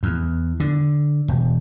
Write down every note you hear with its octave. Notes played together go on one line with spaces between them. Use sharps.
E2
D3
E1